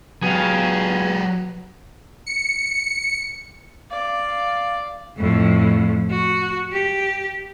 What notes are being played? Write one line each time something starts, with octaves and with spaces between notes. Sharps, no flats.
F#3 B3 G4 G#4 F5
C#7
D5 F5
F2 A2
F#4
G4